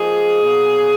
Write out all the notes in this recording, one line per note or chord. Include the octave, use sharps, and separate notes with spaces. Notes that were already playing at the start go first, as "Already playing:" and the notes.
Already playing: F3 A#3 D#4 G#4
B2 F#3 A#3